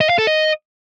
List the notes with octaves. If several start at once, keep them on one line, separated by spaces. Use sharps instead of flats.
D#5
F5
A4
D#5